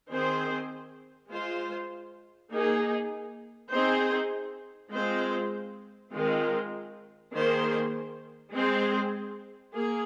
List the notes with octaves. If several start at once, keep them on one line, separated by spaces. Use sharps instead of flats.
D#3 C4 G#4 C5
G#3 F4 C5
A#3 D#4 G#4
C4 D#4 G#4 C5
G#3 C4 F4 C5
D#3 G#3 C4 F4 A#4
D#3 A#3 G#4 C5
G#3 C4 G#4 C5
A#3 G#4